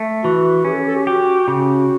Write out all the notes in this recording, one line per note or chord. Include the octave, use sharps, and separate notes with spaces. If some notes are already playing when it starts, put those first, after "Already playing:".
Already playing: A3
E3 F#4
C#4 G4
A4
G4
A4
G4
F#4 G4
C#3 F#4